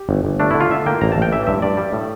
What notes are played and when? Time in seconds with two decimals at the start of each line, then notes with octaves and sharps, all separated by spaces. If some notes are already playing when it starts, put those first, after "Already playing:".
Already playing: G4
0.09 G1
0.25 G1
0.40 A3 D4
0.51 D3 E4
0.60 F4
0.70 D3 E5
0.86 A#3 G5
1.01 A1 A#5
1.12 A1 A5
1.22 G5
1.32 E3 E5
1.47 G2 E5
1.62 G2 D5
1.77 G3
1.93 A2